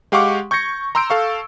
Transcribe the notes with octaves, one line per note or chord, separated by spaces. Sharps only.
G#3 G4 F5 F#5 C#6 D6
C#6 G6 G#6 A#6 C#7
A#5 C6 E6 G6 D7
A4 F5 C#6